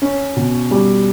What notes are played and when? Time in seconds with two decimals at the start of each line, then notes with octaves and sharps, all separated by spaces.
0.02 C#4
0.36 B2
0.71 G3